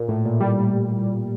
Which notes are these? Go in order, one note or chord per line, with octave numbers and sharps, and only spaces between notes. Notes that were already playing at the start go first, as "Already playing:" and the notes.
Already playing: A#2
A2
A#2
G3